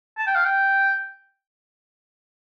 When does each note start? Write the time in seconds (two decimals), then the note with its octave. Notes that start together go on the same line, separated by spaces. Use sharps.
0.18 A5
0.27 G5
0.35 F5
0.45 G5